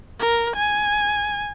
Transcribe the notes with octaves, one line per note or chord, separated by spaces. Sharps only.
A#4
G#5